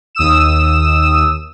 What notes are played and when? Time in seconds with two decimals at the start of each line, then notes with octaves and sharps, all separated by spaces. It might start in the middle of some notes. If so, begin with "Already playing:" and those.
0.15 D#2 D#6 E6 E7